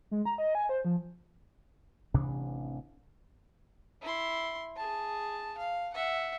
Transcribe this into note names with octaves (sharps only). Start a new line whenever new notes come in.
G#3
A#5
D#5
G#5
C5
F3
A1 C3 E3 D4
E4 C6
G#4 A5
F5
E5 F#5